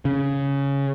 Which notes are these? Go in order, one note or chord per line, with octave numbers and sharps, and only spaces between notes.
C#3